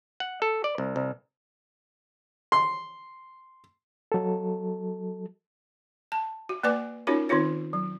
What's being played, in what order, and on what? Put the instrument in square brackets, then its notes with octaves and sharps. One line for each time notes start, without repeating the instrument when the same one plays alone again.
[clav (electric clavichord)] F#5
A4
D5
C2
C2
[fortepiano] C6
[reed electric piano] F#3 A4
[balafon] A5
F#4
A#3 B4 D5 G#5 D6
C#4 D#4 F4 F#4 A#4 C#5
D#3 C4 D#4 F4 C#5
F#3